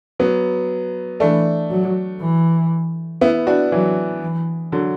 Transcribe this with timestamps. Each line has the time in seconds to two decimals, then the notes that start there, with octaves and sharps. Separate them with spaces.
0.19 F#3 B3
1.20 E3 A3 D4
1.70 F#3
2.20 E3
3.21 B3 E4
3.47 D4 F#4
3.72 E3 F#3
4.22 E3
4.72 D3 F#3